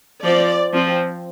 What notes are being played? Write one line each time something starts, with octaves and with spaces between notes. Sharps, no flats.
F3 C4 D5
F3 C4